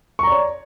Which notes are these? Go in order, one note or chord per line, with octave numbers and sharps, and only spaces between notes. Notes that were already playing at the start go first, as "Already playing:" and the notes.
C#5 D5 A#5 C#6